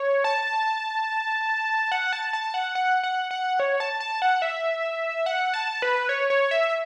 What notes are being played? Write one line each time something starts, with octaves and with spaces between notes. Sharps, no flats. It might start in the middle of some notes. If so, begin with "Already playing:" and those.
Already playing: C#5
A5
F#5
A5
A5
F#5
F#5
F#5
F#5
C#5
A5
A5
F#5
E5
F#5
A5
B4
C#5
C#5
E5